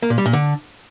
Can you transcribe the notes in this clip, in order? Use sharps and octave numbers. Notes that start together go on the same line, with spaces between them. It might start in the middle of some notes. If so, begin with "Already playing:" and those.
A#3
A#2
G3
A#2
D3